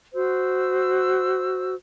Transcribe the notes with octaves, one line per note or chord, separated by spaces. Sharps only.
F#4 C5 E6